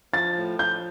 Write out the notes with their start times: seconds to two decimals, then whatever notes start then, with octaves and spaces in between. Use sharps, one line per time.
0.13 F3 A6
0.37 A2
0.59 F3 G6